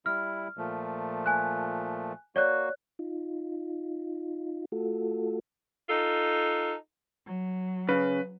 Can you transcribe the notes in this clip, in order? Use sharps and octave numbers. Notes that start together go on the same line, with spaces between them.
G3 E4 F6
A#2 F3 A3
G#5 F#6
A#3 F#4 C#5 D5 F#6
D#4 F4
A3 F4 F#4 A4
D#4 F4 A4
F#3
C#3 B4